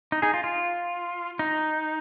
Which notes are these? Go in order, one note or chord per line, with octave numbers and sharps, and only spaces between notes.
D#4
D#4 G#4
F4
F4
D#4